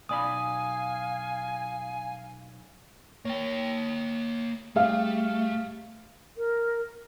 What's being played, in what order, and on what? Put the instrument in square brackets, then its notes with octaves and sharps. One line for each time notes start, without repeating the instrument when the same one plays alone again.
[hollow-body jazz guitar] B1 D5 B5 [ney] F5 [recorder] G#5 [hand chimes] D#6
[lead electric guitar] A#3 G5 [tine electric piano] C#5
[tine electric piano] G3 G4 [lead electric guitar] A3 [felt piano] G#4 E5 F5
[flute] A#4